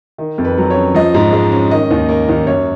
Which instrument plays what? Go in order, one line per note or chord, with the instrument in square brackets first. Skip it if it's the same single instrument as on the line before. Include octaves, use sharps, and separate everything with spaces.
[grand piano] D#3
F2
B4
F#3
C#5
C#4
F3 D#5
G#2
G#3
C#4
D#3 D#5
D#2
A#3
D#2
F#2 C#5